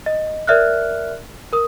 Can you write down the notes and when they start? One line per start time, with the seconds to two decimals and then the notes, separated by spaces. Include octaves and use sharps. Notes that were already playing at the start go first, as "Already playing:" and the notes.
0.06 D#5
0.47 A#4 D5 E5 F6 F#6
1.53 A#4 D#6